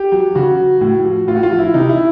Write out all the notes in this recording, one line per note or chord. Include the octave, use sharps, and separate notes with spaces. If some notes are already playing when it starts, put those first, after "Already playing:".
Already playing: G4
F#3
C#3 F#4
F#3
A2
F3
A2 F4
F#4
F4
F3
E4
C3 D#4
E4